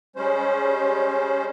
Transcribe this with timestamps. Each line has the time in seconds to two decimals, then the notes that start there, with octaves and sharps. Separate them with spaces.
0.16 G3 G#3 C#4 C5